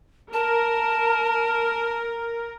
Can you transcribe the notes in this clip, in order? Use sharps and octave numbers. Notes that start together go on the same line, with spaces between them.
A#4 A5